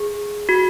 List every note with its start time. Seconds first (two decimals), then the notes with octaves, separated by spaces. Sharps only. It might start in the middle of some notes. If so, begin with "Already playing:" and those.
Already playing: G#4
0.49 F#4